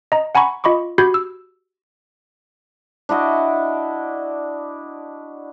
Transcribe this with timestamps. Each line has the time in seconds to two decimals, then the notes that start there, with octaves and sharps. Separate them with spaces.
0.12 D#5 A#5
0.35 F#5 G#5 A#5 B5 C#6
0.64 F4 D#5 B5 C#6 D6
0.98 F#4 G4 B5 G6 G#6
1.14 E6
3.09 D4 E4 F#4 D#5